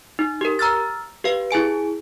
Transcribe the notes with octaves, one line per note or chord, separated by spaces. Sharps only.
D#4
G4 A#4
A#5 E6 F6 A6
G4 B4 F5
E4 G#4 G#5 D7